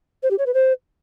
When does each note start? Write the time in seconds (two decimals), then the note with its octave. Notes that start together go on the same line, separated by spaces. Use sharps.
0.23 C5
0.31 G4
0.38 C#5
0.46 B4
0.54 C5